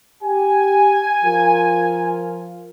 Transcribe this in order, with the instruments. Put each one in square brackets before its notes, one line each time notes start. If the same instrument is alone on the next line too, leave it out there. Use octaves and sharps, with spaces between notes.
[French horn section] G4 [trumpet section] G#5
[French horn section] F3 F4 A#4